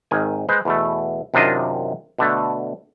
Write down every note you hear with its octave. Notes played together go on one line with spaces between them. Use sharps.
G#1 D#3 G#5
G#3 B4 C5
E2 B2 A3
F#2 C3 D#3 D4 F4 D#5
B2 D3 A3